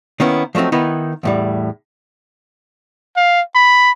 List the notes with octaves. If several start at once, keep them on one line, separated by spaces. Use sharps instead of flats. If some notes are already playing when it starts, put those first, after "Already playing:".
D#3 A#3 B3 C#4 E4
F3 F#3 A3 C4 D#4
D#3 B3 D#4 E4 B4
E2 A2 G3
F5
B5